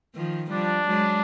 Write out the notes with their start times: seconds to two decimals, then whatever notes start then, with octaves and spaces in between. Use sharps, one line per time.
0.15 D#3 F3
0.51 F3 G3 D4
0.88 F#3 G#3